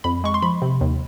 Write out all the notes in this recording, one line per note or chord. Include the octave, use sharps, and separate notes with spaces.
F2 B5
G#3 C#6
C6
F3 B5
C3
D#2